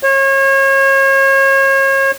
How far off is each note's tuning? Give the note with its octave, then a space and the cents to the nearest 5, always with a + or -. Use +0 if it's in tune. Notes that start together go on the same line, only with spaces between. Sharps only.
C#5 -35